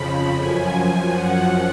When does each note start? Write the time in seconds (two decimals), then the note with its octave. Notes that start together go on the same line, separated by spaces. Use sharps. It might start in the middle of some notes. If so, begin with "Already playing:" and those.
Already playing: F2 C#3 F3 B5
0.35 F#2 F3 G#5
0.73 G#5
1.08 F#2 F3 F#5